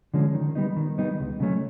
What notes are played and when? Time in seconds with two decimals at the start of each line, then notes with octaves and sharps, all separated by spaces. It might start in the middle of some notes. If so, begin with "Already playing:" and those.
0.14 D3 F3 G#3 C#4
0.34 D#3
0.55 G3 B3 D#4
0.77 D#3
0.98 G3 B3 D#4
1.20 C#2
1.40 C#3 F#3 A3 C#4